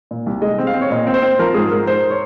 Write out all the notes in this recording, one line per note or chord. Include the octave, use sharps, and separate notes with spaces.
A#2
C2
G#3 D#5
C4
F5
C4
C#5
A#2 D#5
C4
C5
C4
F3 A#4
G#2 G#4
G#2 A#4
G#2 C5
C#5